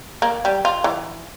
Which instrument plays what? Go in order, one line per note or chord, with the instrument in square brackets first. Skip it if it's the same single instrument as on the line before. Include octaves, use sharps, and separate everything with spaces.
[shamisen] A#3
G3
F4
E3